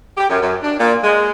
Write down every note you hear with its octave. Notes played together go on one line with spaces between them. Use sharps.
G4
F#2
F#2
D4
A#2
G#3